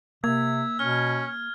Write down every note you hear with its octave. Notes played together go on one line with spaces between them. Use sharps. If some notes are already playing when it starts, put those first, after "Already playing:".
C3 A#3 E5 G#6
B2 C#4 F6